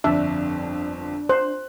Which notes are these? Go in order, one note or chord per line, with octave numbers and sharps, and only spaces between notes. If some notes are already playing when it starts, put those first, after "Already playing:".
G1 F2 D4 E5
C5 F#6